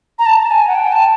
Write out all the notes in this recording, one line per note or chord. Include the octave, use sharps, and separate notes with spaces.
A#5
A5
G#5
F#5
G5
A5